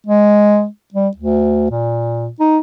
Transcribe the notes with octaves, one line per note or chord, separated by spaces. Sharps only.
G#3
G3
D2
A#2
D#4